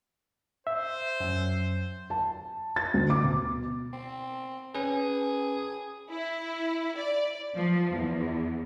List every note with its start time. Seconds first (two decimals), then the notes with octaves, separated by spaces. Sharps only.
0.67 C5 E5
1.20 F#2 F#3
2.10 A5
2.76 A6
2.94 D2
3.10 D6
3.24 B2
3.93 C4
4.75 C#4 G#4 B4
6.10 E4
6.97 D5
7.55 F3
7.93 E2